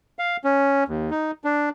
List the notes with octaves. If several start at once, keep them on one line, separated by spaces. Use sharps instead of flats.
F5
C#4
D#2
D#4
D4